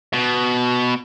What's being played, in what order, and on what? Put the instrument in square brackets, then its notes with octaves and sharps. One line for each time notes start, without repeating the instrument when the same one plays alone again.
[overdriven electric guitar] B2